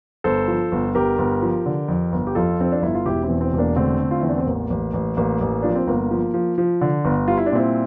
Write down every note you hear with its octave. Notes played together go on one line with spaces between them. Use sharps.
G1 A4 C5
F3
G1
G1 G4 A#4
G1
F3
D3
F2
G1
G4
F2 F4 A4
F2 C4
D4
G1 E4
F4
E1 E4 G4
C4 E4
E2
C4 E4
E1
A#3 D4
D3 A3 C4
D3
F4
E2 E4
D4
C4
A1 A#3
A1
A1
A1 A#3
A1
F3 D4
C4
G1 A#3
F3
F3
F3
D3
G1
G3 F4
E4
D4
A#2 C4 E4